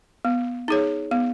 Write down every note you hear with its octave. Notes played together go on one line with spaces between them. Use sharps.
B3
D#4 G#4 C#5
B3